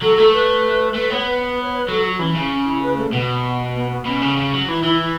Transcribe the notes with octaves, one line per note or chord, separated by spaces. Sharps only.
F#3 A4
A3 A4
B4
A3 B4
B3 C#5
B4
C#5
B4
F#3 A4
F#4
E3 C#4
C#3 C#4
C#4
E4
B4
A3
B2 B3
B3
B3
B2 C#4
C#3
C#3
F#3
E3 E4
E3 E4